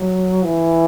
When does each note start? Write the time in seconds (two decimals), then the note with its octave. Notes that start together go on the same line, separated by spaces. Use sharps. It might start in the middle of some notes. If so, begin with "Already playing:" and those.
Already playing: F#3
0.43 E3